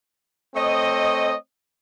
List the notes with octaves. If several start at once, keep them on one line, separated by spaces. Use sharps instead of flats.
A3 C4 C#5 D#5